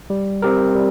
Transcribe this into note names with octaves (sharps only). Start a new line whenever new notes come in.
G3
C4 G4 A#4
G3